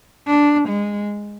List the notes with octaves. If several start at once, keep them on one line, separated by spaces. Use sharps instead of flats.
D4
G#3